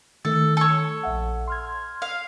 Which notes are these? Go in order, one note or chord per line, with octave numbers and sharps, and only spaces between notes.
D#3 A3 A4
A4 C#5
A#1 E5 F#5
C6 F6 G#6
F5